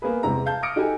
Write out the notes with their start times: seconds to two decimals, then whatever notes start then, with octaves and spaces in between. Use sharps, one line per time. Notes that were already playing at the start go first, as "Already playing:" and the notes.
0.02 A#3 B3 G#4 B4
0.23 E2 C3 G#3 C4 A#5
0.46 F5 A5 G6
0.63 D6 D#6 F6 A#6 C#7 D7
0.76 D#4 F#4 G4 A4 G#5